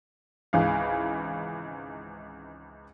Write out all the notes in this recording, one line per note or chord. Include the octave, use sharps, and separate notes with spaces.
G#1 C#2 E3 F5